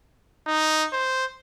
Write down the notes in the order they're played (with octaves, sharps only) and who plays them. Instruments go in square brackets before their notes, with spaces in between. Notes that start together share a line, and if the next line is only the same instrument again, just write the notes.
[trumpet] D#4
C5